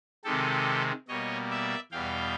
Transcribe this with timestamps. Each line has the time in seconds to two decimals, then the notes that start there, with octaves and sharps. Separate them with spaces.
0.25 C3 D#3 G#3 G4 A4
1.08 B2 G3 A#3 C#5 D#5
1.50 D5 E5
1.92 E2 B2 G3 F5 G5